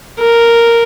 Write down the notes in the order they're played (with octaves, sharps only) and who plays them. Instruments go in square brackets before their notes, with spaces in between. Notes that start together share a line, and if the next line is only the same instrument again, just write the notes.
[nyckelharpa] A#4